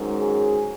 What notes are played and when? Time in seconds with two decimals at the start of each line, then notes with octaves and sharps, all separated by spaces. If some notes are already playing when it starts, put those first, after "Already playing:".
Already playing: G#2 D#3 F#3 C#4
0.20 G#4